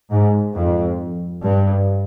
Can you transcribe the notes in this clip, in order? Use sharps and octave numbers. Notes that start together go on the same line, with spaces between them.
G#2
F2
G2